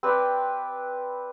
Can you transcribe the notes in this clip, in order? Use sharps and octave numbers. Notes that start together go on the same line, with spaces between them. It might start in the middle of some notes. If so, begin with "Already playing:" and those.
C4 B4 D5